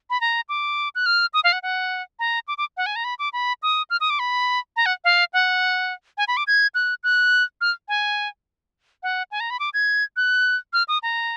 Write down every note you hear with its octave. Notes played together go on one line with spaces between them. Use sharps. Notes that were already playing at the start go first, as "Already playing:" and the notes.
B5
A#5
D6
F#6
F6
D#6
F5
F#5
F#5
A#5
D6
D6
F#5
G#5
A#5
B5
D6
B5
D#6
F6
D#6
D6
B5
A#5
F#5
F5
F#5
G#5
B5
D6
G#6
F#6
F#6
F6
G#5
F#5
G#5
A#5
B5
D6
G#6
F#6
F6
D#6
A#5